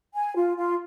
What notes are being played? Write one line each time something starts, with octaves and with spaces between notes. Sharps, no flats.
G#5
F4
F4